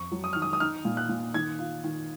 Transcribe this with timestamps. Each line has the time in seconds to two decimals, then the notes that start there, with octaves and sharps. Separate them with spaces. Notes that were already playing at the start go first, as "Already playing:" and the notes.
Already playing: F2 C#6
0.12 F#3
0.24 D#6
0.33 D#3 F6
0.42 D#6
0.53 D#6
0.60 D#4 F6
0.85 A#2
0.97 F#6
1.09 A#2
1.34 D#3 G#6
1.59 F4
1.84 D#3